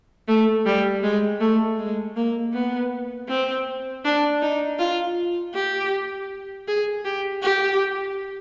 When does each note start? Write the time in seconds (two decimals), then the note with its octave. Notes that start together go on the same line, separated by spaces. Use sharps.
0.28 A3
0.66 G3
1.03 G#3
1.41 A3
1.79 G#3
2.16 A#3
2.53 B3
3.29 C4
4.05 D4
4.42 D#4
4.79 F4
5.55 G4
6.68 G#4
7.05 G4
7.43 G4